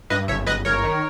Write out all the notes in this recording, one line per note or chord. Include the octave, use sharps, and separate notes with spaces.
G2 B4 D#5
G1 C#5 E5
G1 B4 D#5
G1 A#4 C#5
D#3